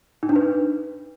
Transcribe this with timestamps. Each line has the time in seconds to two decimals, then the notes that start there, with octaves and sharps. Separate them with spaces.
0.23 D#4
0.29 D4
0.36 B4